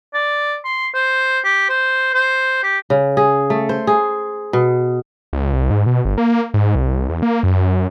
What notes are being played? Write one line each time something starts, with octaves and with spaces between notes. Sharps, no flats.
D5
C6
C5
G4
C5
C5
G4
C#3
G#4
A3
C5
G#4
B2
C#2
C2
G#2
B2
G1
A#3
G#2
C2
E2
A#3
F#2